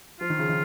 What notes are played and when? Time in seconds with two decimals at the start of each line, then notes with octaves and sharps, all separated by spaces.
0.20 F3 F4
0.30 D#3
0.39 C#3
0.49 D#3